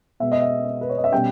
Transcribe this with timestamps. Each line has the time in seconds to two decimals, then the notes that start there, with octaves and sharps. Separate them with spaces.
0.20 B2 G#3 B3 E5
0.32 D#5
0.42 E5
0.81 B4
0.89 C#5
0.97 D#5
1.04 E5
1.12 B2 G3 C#4 G5